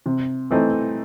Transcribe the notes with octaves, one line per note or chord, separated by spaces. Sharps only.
C3
E3 A3 C4 D#4